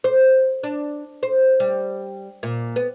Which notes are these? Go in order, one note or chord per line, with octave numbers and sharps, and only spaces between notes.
C5
D4
C5
G3
A#2
B3